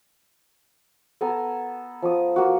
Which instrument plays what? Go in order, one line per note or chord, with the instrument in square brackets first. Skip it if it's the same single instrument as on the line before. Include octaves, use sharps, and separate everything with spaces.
[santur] B3 A4 G#5 A#5
F3 D#6
A#3 F#4